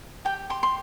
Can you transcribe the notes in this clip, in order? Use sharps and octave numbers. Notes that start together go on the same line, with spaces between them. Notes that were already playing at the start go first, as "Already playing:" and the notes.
G4 G5
G4 C6
C6